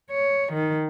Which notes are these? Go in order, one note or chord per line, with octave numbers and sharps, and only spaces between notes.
C#5
D#3